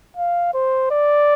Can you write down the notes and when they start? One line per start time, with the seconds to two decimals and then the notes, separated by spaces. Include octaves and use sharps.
0.17 F5
0.54 C5
0.91 D5